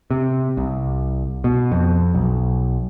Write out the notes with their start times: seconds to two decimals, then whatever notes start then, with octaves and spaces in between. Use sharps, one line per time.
0.11 C3
0.57 C2
1.44 B2
1.72 F2
2.15 B1